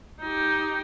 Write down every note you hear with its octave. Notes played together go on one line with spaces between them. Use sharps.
D#4 G4